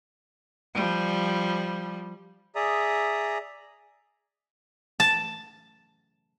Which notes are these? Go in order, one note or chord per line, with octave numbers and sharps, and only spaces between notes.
F3 G3
G#4 D5 E5 A#5 D#6
A5